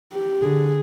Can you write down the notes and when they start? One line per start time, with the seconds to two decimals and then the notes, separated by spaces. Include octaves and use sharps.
0.13 G4
0.42 D3 G#4